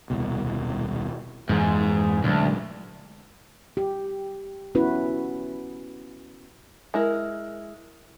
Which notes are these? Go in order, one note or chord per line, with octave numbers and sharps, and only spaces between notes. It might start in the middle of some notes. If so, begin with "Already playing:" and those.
D#1 C2 B2
F2 G#2 E3
D2 A#2 F#3 G#3
G4
B3 C#4 E4 F#4 B4
G#3 E4 A#4